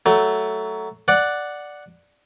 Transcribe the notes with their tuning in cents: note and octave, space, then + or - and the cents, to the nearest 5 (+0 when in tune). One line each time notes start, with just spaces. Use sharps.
F#3 +15 A3 +0
D5 +0 F#5 +0